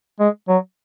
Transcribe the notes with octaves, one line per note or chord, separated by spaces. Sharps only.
G#3
F#3